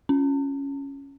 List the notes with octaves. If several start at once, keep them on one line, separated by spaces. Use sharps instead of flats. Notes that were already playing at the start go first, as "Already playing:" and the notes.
C#4